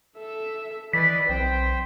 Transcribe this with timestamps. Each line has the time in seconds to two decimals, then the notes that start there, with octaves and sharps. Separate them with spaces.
0.17 A4 E5
0.93 E3 E4 B4 D5 D#5 B6
1.29 B1 C4 C5 G5